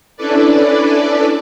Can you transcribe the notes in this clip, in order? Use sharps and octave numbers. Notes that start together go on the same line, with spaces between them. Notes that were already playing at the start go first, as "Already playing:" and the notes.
C#4 D4 E4 A4 B4 D5